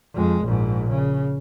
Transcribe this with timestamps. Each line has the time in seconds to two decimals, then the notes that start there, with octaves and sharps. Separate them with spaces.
0.14 F2 G#3
0.44 A#1 G#2
0.90 C#3